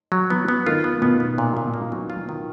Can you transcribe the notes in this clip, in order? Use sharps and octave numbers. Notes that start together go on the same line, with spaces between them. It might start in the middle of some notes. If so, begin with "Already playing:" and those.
F#3
B3
B3
D#3 F4
B3
B2 B3
B3
A#2
A#2
A#3
F#3
F4
D#3